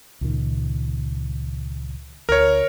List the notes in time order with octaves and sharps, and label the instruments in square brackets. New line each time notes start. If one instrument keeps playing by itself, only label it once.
[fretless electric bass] C#2 A#2 D#3
[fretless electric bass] D2 [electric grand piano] A#4 C#5